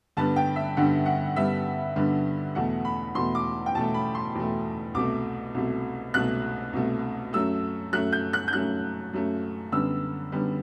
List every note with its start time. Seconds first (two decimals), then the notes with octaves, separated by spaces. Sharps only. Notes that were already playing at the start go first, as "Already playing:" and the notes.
0.17 G2 D3 G3 B3 A5
0.36 G5
0.56 E5
0.77 G2 D3 G3 B3 F#5
1.06 F#5
1.36 G2 D3 G3 B3 E5
1.96 G2 D3 G3 B3
2.55 E2 B2 A3 F#5
2.85 B5
3.15 E2 B2 A3 C6
3.35 D6
3.66 G5
3.75 E2 B2 A3 A5
3.94 B5
4.15 C6
4.35 E2 B2 A3
4.94 C2 B2 A3 D6
5.54 C2 B2 A3
6.14 C2 B2 A3 F#6
6.73 C2 B2 A3
7.33 F#2 F#3 A3 E6
7.93 F#2 F#3 A3 F#6
8.13 G6
8.33 F#6
8.48 G6
8.53 F#2 F#3 A3 F#6
9.13 F#2 F#3 A3
9.72 F#2 D3 G3 B3 E6
10.32 F#2 D3 G3 B3